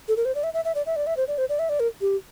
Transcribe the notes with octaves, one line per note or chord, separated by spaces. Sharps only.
A4
A#4
C5
D5
E5
E5
E5
D5
E5
D5
E5
C5
D5
C5
D5
E5
D5
A#4
G4